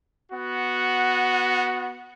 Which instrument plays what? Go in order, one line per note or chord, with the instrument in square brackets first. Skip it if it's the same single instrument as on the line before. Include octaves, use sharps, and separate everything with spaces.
[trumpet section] B3 F#4